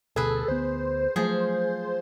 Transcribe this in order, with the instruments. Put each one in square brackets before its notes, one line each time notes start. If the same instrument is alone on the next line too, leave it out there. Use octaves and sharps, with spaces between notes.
[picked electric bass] D2 B2 [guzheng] G#4 B4 [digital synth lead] A4
[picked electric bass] D2 B3 [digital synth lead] C5
[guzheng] F3 G#4 [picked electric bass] F#3 A3